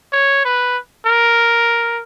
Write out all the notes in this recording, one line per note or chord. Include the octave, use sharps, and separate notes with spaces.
C#5
B4
A#4